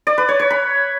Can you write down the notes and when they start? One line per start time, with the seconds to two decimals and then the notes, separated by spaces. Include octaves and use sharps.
0.07 D5
0.18 B4
0.29 C#5
0.40 C#5
0.50 B5